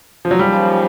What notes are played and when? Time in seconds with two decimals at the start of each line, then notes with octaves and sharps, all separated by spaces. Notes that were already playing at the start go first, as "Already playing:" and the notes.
0.25 F3
0.31 F#3
0.39 D#2 C#3 F3 G3